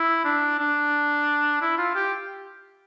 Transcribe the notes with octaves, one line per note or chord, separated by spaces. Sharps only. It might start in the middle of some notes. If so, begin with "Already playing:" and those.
Already playing: E4
D4
D4
E4
F4
G4